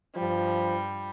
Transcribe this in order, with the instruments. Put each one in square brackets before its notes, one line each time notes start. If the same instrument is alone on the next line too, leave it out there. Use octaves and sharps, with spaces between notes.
[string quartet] G2 G3 [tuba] F3